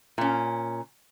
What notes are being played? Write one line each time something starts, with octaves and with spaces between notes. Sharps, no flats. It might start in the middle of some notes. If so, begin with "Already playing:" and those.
A#2 C#4